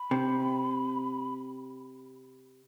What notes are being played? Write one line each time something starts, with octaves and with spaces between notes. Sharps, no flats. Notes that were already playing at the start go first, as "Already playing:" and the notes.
Already playing: B5
C3